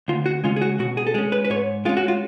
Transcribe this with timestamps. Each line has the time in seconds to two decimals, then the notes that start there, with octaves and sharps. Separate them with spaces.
0.08 D2 F4
0.26 F#4
0.44 C#3 G#3 C#4 F4
0.56 G#4
0.61 F#4
0.79 B2 F#4
0.97 G#4
1.07 A4
1.14 G#3 G#4
1.18 C#4
1.32 B4
1.44 B4
1.50 G#2 C#5
1.85 G#3 C#4 F4
1.97 F#4
2.08 F4